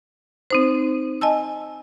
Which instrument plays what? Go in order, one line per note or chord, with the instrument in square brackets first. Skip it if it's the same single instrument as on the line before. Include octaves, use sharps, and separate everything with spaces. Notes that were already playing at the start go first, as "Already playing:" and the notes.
[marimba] C4 D#4 C5
D#5 G#5 A5 E6